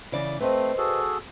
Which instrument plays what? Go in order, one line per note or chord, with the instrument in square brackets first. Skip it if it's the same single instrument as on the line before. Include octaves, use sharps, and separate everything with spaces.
[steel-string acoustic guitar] C#3 E3 D5
[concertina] A3 C4 [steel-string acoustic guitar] B4 C5 D#5
[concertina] F#4 G#4 A4